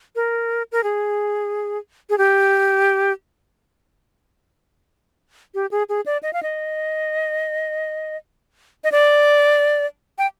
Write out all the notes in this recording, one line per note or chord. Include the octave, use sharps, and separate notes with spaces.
A#4
A#4
G#4
G#4
G4
G4
G#4
G#4
D5
D#5
F5
D#5
D#5
D5
G5